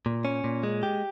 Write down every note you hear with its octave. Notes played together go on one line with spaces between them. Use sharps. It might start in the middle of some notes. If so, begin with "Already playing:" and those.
A#2
C#4
A#2
G#3
G4